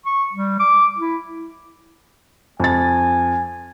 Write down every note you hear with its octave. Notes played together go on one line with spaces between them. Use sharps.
C#6
G3
D6
E4
F2 G#5 A6